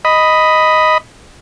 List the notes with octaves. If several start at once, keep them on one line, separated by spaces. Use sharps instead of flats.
D#5 B5